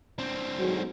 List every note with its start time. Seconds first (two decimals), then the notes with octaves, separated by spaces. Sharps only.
0.18 C4 D4
0.57 D2 G#2 F#3